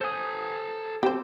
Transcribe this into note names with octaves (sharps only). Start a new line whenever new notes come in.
A4 C5 G#5 D#6
C4 G4 A4 C5